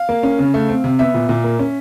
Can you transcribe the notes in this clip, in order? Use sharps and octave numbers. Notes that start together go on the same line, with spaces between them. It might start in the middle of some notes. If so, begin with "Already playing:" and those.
Already playing: F5
A#3
C#4
C#3
A3
C4
C3
B3 E5
A#2
A#2
A#3
C#4